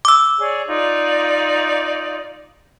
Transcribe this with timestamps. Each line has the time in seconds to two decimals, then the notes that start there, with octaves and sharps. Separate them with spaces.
0.05 D6 E6
0.40 G#4 C#5 D5
0.67 D#4 F4 D5